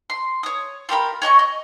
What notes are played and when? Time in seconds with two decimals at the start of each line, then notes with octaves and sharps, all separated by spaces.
0.10 C6
0.43 C#5 D#6
0.89 F4 G4 A#4 B5
1.22 C#5 D#5 G#5 C#6
1.39 D#5